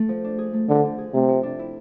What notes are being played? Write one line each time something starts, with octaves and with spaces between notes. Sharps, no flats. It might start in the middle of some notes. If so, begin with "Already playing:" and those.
Already playing: A3
F3
D4
G#4
A3
D3 F3
D4
G#4
C3 A3
F3
D4
E4